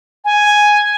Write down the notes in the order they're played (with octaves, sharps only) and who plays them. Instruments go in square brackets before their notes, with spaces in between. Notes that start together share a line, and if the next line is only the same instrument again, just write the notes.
[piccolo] G#5